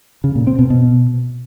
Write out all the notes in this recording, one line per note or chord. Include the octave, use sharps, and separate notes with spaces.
C#3
A#2
C4
B2
B2